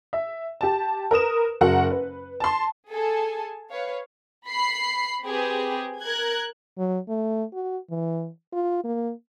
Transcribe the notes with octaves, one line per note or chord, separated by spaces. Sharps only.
E5
G4 A5
A#4 B4 D#6 E7
F#1 F#4 A#4 F#5
B4
A5 C6
G#4 A4 G#5 A5
B4 C#5 F5
B5 C7
C4 G4 G#4 B4
A#4 F#6 G#6
F#3
A3
F#4
E3
F4
A#3